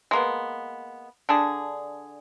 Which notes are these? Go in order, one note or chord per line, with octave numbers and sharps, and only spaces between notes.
G#3 A#3 B3
D3 D4 G#4